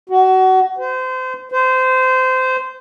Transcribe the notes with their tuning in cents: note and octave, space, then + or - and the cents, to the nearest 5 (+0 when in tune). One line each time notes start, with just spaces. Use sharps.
F#4 +25
C5 -30
C5 -20